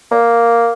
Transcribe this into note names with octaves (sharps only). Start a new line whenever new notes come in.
A#3